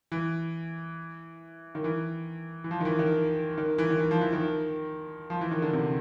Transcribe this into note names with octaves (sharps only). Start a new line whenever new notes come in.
E3
D#3
E3
E3
F3
D#3
E3
D#3
D#3
E3
D#3
E3
F3
E3
D#3
F3
E3
D#3
D3
C3